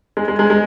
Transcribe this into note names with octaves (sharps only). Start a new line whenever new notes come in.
G#3
G#3
G#3
G#3